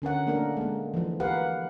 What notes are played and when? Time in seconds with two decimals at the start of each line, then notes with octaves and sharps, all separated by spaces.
0.02 D3 C#4 A#4 F#5
0.27 A3 A#3 D4 A4 A#4
0.57 G#3 A#3
0.94 E3 F3
1.20 G4 A#4 B4 F5 F#5